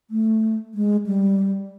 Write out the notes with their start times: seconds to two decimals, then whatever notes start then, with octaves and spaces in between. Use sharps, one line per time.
0.10 A3
0.74 G#3
1.06 G3